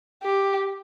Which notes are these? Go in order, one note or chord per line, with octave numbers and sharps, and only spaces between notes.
G4